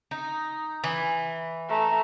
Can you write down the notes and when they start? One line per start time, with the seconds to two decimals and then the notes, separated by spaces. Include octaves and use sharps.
0.11 D#4
0.84 E3
1.69 A3 A#5